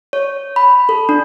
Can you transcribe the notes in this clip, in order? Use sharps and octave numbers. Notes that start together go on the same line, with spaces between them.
C#5
B5
A4
D4